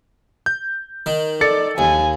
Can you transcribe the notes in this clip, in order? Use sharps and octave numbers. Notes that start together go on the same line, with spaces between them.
G6
D#3
A4 D5 A6 C#7
D#2 G#5